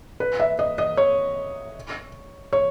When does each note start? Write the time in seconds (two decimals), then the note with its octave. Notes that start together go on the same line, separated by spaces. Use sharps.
0.20 B4
0.40 E5
0.59 D#5
0.78 D#5
0.97 C#5
2.53 C#5